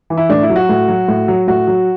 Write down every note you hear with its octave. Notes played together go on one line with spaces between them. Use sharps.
E3
E4
A2 D4
E4
F#3
F#4
A2
F#3
A2
F#3
A2 F#4
F#3